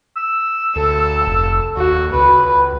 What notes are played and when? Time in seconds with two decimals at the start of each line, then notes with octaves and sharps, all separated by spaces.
0.17 E6
0.76 D2 A4
1.27 F1
1.77 D#2 F#4
2.14 C#2 B4